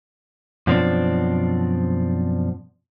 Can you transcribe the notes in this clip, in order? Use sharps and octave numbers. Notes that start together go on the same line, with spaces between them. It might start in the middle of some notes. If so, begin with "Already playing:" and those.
F#2 B2 F3 C4 D4